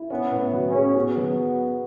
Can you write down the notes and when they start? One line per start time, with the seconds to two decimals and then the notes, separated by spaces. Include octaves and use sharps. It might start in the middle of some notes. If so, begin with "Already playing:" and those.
Already playing: E4
0.10 B3 C#4
0.31 A2
0.39 B3
0.53 F#3
0.68 C#4
0.74 G#4
0.95 B3 F#4
1.17 F#3